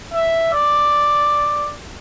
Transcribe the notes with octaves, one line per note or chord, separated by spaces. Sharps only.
E5
D5